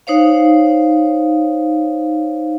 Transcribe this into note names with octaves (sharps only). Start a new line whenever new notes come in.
D#4 C5 C#5 F5